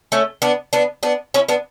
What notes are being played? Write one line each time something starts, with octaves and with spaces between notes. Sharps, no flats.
A3 C#4
B3 D4
B3 D4
B3 D4
C#4 E4
B3 D4